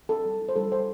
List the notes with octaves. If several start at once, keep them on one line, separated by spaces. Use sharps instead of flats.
C4 A4
G3
E4
C5
G3 A4
E4 C5